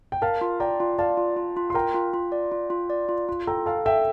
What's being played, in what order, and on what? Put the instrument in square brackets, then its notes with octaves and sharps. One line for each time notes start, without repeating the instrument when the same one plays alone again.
[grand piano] G5
[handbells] A#4 [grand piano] F5 A5
[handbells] F4
[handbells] D5 [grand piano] G5 A#5
[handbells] F4
[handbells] D5 [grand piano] F5 A5
[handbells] F4
F4
F4
[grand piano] C6
[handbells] A#4 [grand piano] G5 A#5
[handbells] F4
F4
D5
F4
F4
D5
F4
F4
[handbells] A4 [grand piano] G5 A#5
[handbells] A4 [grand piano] F5 A5
[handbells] A4 [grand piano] E5 G5